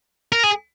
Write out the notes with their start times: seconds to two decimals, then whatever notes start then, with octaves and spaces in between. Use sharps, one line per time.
0.32 A#4
0.43 G#4